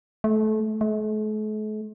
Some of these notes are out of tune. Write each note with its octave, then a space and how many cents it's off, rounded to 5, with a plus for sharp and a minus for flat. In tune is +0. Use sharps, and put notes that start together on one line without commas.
A3 -25
A3 -45